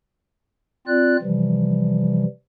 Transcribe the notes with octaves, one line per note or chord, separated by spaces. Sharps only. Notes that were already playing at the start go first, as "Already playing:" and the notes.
C4 F4 D5 F#6
C3 E3 F3 G3